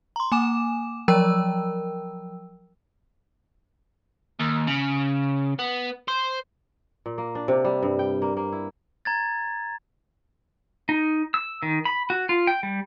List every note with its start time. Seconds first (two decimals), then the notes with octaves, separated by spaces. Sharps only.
0.16 A#5 C6
0.32 A#3 G#5 D6 E7
1.08 F3 F#3 A#4 G5 E6
4.40 D#2
4.68 C#3
5.59 B3
6.08 C5
7.06 A#2
7.18 A#3
7.35 D4
7.48 C3
7.65 G3
7.83 G2
7.99 G5
8.22 A#3
8.37 A#3
8.52 E4
9.05 A#5 G#6 A6
10.89 D#4
11.34 E6
11.63 D#3
11.85 B5
12.10 F#4
12.29 F4
12.47 G5
12.63 G3